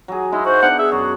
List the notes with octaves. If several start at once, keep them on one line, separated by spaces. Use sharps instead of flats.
F#3 G#4
G#3 D#4 E4
F#4 C5
B3 D4 F5 F#5
G#4 E5
F#2 F#4